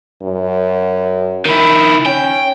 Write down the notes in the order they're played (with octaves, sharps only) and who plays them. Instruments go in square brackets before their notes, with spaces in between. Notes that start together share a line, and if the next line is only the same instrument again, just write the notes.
[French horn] F#2
[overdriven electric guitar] D#3 E4
[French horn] C#4 [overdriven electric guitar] G5